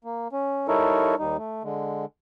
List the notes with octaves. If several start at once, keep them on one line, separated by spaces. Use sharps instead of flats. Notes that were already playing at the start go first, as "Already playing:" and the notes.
A#3
C#4
G3 D#4 E4 A4 A#4 C#5
D#2 G3 D#4
A3
D3 G#3